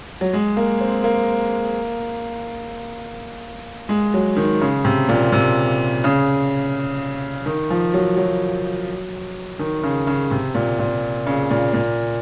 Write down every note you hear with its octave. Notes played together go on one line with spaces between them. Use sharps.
F#3
G#3
A#3
C4
A#3
G#3
F#3
D#3
C#3
C3
A#2
C3
C#3
D#3
F3
F#3
F#3
D#3
C#3
C#3
C3
A#2
A#2
C#3
A#2
A#2